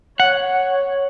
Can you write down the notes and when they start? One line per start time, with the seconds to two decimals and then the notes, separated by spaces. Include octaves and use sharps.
0.20 C#5 F#5